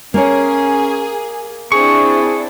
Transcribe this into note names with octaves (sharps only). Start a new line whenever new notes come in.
A#3 C#4 G#4 C#5
C4 D4 E4 G#4 C#6